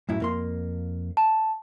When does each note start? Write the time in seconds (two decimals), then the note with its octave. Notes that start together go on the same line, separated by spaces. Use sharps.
0.09 F#2 A2 E4
0.20 F2 A#3 C6
1.17 A5